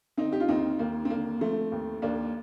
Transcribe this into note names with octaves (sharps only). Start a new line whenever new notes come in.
D3 C4 D#4
G4
F4
D#2 C4 D#4
D#2 A#3
C4
D3 A#3
F3 A3 C4
D#2
D#2 A#3 D4